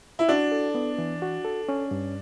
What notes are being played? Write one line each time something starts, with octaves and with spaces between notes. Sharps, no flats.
E4
D4 F#4
A4
B3
E3
F#4
A4
C#4
G2